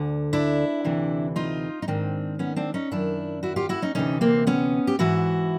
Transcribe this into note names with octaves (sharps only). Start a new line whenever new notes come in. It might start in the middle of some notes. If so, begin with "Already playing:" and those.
Already playing: D2 D3
D4 E4
D2 C3 E3
D#4 F4
D#4
G#2 D#3 C4 D4
B3 C#4
C4 D4
C#4 D#4
F#2 D#3 D4 E4
E4 F#4
F4 G4
E4 F#4
C#4 D#4
D2 C3 E3 C#4 D#4
A#3 C4
B3 C#4
G4
G#2 E3 E4 F#4